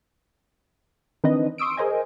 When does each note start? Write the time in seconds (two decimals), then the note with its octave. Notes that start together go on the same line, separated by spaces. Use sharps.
1.24 D#3 E3 C4 D4 B4 D#5
1.58 C6 C#6 D#6 E6 D7
1.77 G#4 A#4 C5 D#5 G#5